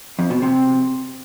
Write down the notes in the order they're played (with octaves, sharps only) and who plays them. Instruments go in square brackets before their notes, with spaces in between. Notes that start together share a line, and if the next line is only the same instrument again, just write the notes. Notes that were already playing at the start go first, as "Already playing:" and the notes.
[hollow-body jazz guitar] F2
B2
C3